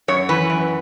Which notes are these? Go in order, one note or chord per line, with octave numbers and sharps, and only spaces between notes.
F#2 C#5
E3 B4
F#2